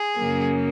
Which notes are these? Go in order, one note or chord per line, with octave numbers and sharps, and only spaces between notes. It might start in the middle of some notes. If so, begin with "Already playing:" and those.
Already playing: G#4
F#2 C#3 F#3 A#3